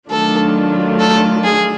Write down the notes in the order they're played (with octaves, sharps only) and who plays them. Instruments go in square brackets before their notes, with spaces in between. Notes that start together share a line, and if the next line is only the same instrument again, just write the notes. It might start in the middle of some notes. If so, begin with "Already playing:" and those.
[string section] D#3 F#3 A3 D4 F4 [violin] A4
[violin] A4
G#4